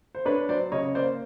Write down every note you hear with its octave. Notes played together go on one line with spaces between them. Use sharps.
C5
D4 B4 C#5
F#3 C5 D5
C#3 C#5 D#5
A#3 C5 D5